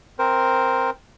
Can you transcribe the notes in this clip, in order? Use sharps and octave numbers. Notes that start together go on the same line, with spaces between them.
C4 A#4 C5